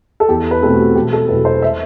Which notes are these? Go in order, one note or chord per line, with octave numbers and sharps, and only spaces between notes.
A4
E2 G4
B4
B2 A3 C4 A4
F#4
G4
E1 G4
A4
E2 B2 F#3 B4
C5
E5